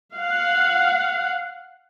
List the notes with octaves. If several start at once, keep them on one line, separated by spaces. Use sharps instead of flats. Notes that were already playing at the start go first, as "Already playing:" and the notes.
F5 F#5